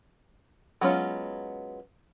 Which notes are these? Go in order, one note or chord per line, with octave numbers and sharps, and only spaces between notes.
F#3 G#3 B3 C#4 F4